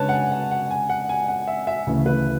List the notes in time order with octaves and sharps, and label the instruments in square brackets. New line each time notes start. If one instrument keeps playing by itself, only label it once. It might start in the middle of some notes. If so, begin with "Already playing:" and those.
Already playing: [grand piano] C#3 G#3 D4 [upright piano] B4 C#5 A5
[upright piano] F#5
G#5
F#5
F#5
G#5
F#5
G#5
F#5
E5
E5
[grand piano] D2 C#3 E3 A3
[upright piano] B4